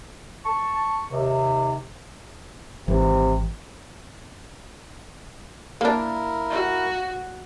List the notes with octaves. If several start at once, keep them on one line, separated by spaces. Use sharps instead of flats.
A5 C#6
D#2 C3
G#1 C3 E3
A#3 D4 E4 A#4 F5
F#4